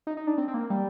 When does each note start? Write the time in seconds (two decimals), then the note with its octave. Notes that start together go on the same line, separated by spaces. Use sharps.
0.07 D#4
0.17 D#4
0.27 D4
0.38 C4
0.48 C4
0.54 A#3
0.70 G3